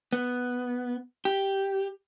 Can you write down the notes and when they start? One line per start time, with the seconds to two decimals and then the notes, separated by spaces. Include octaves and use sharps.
0.13 B3
1.25 G4